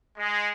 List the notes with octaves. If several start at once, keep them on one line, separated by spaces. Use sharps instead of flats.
G#3